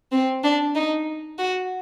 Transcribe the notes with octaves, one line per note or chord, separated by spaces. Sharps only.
C4
D4
D#4
F#4